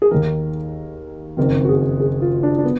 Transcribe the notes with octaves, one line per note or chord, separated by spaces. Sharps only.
G#4
D#2 D#3 A#4
F#1 F2 D#3 A#4
F#4
G#4
G#4
F4
D4
D4
B3